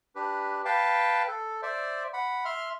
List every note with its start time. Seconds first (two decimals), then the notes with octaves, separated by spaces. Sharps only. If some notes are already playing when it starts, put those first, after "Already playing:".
0.16 D4 G4 B4
0.65 B4 F5 G5 A5
1.28 A4
1.62 C5 D5 E5
2.13 F#5 B5
2.45 E5 C6 F6